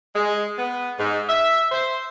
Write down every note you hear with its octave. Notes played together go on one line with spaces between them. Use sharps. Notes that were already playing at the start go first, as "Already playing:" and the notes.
G#3
B3
G#2
E5
C5